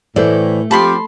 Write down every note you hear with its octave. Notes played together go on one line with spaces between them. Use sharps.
A2 E3 A3 C5 D5
F3 C4 G4 A5 B5 C6